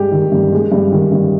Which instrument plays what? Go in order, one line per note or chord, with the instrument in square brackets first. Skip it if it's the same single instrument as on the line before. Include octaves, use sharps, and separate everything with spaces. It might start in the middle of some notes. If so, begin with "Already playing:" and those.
Already playing: [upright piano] G2 G3 G#3 G4
D#3
G2
G#3
G2
D#3
G2